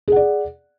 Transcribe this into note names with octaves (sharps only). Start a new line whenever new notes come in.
G#4 D5 F#5